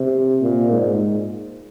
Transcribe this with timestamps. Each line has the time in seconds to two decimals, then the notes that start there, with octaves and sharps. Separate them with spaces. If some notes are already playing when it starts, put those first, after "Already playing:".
Already playing: C3
0.42 A#2
0.71 G#2